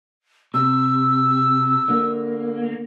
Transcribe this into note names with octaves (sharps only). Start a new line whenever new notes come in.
C3 E6
D3 A#3